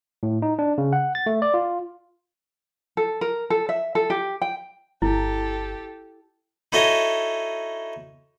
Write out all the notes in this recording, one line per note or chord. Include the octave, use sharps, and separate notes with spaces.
A2
D#4
D4
C#3
F#5
A6
A3
D5
F4
A4
A#4
A4
E5
A4
G4
G5
G1 E4 G4 A4
D#4 E4 F#4 A4 C#5 D#5